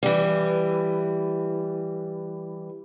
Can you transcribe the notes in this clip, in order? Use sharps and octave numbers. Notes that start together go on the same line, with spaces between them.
E3 G3